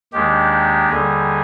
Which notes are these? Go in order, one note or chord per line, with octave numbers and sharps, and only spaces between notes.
D#2 D#3 G#3 D4 G4
D#2 D3 G3 G#4